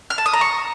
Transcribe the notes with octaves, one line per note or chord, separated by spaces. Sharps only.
F6
A5
D#6
A#5
C#6